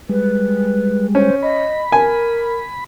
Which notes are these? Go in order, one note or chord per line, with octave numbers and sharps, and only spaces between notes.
G3 G#3 B4
C#4 C5
D#5 B5
A#4 G#5